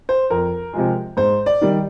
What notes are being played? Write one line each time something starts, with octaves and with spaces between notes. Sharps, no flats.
C5
F2 A#4
C3 F3 G#3
G#2 C5
D5
D#3 G3